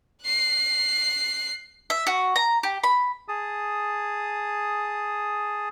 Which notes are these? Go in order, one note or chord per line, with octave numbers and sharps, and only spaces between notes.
F#6 C7
E5
F#4
A#5
G4
B5
G#4 A5 D#6